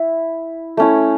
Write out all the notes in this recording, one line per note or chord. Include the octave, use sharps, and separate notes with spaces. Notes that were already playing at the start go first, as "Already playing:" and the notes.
Already playing: E4
A3 C#4 E4